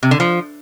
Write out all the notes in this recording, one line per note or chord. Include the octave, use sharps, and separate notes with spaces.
C3
D3
F3